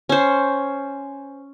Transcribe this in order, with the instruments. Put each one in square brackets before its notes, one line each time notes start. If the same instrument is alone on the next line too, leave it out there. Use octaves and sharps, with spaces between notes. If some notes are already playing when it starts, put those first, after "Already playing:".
[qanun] C#4 C5